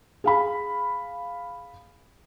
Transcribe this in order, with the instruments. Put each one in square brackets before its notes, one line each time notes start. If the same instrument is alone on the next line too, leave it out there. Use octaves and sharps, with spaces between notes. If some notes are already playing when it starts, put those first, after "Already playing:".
[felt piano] G#4 F5 B5